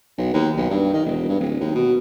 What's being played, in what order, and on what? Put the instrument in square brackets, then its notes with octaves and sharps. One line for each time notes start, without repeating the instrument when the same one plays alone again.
[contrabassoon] B1
D#2
B1
G2
D#3
E1
G2
D1
D#2
B2